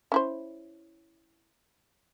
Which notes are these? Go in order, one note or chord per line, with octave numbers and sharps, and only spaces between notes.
C#4 E4 C5